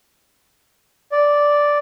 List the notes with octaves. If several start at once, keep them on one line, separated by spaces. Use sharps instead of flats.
D5